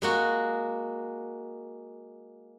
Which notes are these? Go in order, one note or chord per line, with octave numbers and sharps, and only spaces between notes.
G#3 A#3 F#4